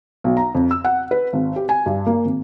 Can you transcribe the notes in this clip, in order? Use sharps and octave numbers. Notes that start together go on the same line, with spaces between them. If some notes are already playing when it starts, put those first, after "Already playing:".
B1
A#5
F2
E6
F#5
B4
G#1
G4
G#5
G2
A#3
G#1